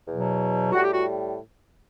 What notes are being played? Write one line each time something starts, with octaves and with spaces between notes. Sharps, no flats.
E2 B2 F#3
A2 G3 F#4
G4
F#4